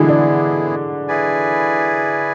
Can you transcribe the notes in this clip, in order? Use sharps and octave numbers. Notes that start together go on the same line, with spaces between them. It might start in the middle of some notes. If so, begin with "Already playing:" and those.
Already playing: D3 E3 F#3 G#3 B3 E4 G#4
D4
E4 G#4 B4 D5 G#5